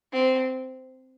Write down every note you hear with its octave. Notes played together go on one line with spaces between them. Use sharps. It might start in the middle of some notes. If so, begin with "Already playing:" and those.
C4